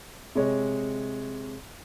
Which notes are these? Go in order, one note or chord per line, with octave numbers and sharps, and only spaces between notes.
C3 G#3 C#5